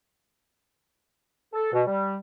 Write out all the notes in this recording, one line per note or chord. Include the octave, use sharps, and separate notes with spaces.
A4
B2
G3